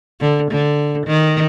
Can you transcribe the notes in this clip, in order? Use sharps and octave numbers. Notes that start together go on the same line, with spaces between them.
D3
D3
D#3